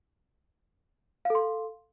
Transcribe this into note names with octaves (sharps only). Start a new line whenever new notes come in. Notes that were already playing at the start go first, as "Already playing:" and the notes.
A4 F5 C6